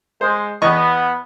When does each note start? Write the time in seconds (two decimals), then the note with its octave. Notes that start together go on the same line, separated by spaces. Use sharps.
0.21 G#3 C5
0.62 E2 B3 D#5 C#6